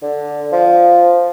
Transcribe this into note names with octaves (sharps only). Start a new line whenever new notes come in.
D3
F3